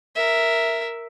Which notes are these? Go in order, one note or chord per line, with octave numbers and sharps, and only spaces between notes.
A#4 E5